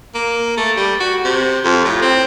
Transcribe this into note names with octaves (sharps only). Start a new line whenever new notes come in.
A#3
A3
G3
F#4
C3
F2
A2
C4